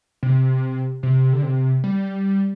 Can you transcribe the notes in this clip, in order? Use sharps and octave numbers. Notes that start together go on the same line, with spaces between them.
C3
C3
D3
C3
G3